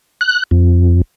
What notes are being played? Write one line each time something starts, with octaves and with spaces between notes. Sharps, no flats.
F#6
F2